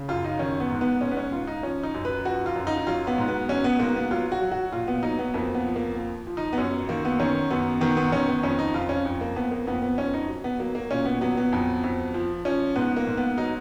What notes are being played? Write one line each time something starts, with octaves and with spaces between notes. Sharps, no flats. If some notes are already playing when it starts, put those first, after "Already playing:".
Already playing: C#3
F#2 F4
D#4
D#3 C#4
B3
G#2
B3
G#2 C#4
B3
C#4
G#2 F4
D#4
F3 C#4
D#4
F#2
B4
F3 F#4
F4
F#2
D#4
D#4
F#3 F4
B3
G#2
B3
F#3 C#4
B3
G#2 A#3
B3
F#3 F4
F#4
F#3
F#4
A#2 F4
B3
F#3 D#4
B3
F2 A#3
B3
F3
A#3
F3
F3
D#4
B3
F#2 C#4
D#3 A#3
B3
D#3 C#4
F#2 B3
D#3 B3
B3
D#3 C#4
B3
F2 C#4
D#4
F2 F4
C#4
F2
A#3
F2 B3
A#3
F2 B3
B3
F2 C#4
D#4
F#3
B3
F#3 A#3
A#3
A#2 C#4
B3
F#3 B3
B3
F2
F2
F3
F3 C#4
G#2 B3
A#3
G#2
B3
F#3 D#4